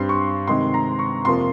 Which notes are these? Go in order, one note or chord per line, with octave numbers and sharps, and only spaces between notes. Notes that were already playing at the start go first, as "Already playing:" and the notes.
Already playing: G2 G3 C4 C6
C#6
C3 D#3 G#3 C4 C6
A#5
C#6
F2 C3 F3 A#3 C6